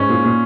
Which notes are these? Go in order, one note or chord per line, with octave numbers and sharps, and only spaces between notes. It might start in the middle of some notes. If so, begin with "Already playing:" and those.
Already playing: G#2 C#4
A#2
A#2